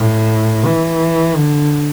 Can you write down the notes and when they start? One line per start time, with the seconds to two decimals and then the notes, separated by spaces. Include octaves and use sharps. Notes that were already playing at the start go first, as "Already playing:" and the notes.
Already playing: A2
0.65 E3
1.36 D3